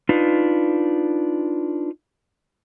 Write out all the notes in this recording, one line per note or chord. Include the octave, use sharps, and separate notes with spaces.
D4 D#4 F4 B4